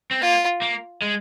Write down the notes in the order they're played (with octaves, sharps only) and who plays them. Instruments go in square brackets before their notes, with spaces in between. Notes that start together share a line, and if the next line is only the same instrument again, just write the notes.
[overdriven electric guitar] C4
[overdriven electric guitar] A#3 [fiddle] F4
[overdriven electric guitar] A#3
G#3